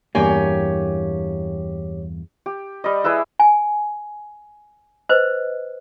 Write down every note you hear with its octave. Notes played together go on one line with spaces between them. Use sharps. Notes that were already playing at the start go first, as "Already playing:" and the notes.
E2 G2 A#3 G4 C#5 G#5
G4
G3 D#5
E4 G#4 B4 E5
G#5
B4 C5 D#5